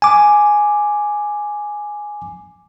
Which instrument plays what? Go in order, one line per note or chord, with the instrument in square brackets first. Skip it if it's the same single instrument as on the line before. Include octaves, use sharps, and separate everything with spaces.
[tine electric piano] G#5 D6